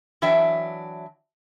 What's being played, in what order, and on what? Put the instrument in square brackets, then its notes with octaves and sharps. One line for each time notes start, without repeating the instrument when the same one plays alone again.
[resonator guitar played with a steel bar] E3 F#3 D4 E5 G5